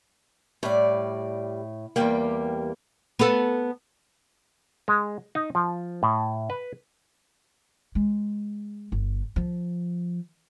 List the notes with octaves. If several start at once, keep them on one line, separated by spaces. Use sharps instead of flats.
A2 G3 D5
E2 G3 A#3 G4 G5
B3 A4
G#3
D#4
F3
A2
B4
G#3
G1
F3